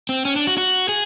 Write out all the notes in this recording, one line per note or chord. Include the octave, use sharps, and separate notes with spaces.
C4
C#4
D4
F#4
F#4
G#4